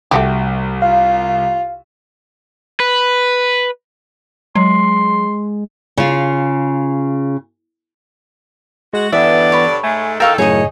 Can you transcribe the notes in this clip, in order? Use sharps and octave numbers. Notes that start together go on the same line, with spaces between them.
C2 A3 F#4 G4
F4 F5
B4
F#3 G#3 C6
C#3 F4
G#3 F#4
G2 D3 E3 B3 D5 E5
C#5 B5
G#2 G#3 A3 G#5
E2 D#4 A4 A#4 F5 G5 C#6 E6
F#2 A2 C#3 D#4 G#4 C#5 D#5